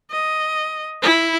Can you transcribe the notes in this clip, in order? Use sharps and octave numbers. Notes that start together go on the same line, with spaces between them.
D#5
E4